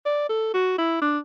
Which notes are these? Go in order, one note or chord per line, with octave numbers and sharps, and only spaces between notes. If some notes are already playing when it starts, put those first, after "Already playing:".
D5
A4
F#4
E4
D4